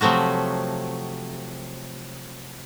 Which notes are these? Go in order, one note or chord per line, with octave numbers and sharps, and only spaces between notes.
C3 F3 F#3 A3 F#4